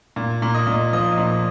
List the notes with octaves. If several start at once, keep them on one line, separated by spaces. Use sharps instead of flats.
A#2
A#2
D#5
A#2
F3 D#5
A#2